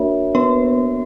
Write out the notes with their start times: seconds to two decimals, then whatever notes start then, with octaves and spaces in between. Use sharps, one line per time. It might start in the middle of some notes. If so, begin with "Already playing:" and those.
Already playing: A#3 D4 F#4 A#4 C#5 E5
0.35 B3 B4